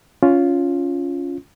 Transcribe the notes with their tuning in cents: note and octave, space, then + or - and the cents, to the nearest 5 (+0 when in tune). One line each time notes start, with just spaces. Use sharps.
C#4 +15 F4 +0